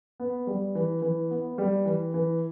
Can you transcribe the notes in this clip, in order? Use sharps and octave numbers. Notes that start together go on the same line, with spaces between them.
B3
G3
E3
E3
B3
G3
E3
E3